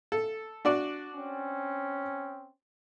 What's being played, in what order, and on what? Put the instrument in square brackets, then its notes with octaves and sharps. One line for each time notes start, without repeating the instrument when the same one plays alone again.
[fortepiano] A4
D4 F#4 D5
[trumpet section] C4 C#4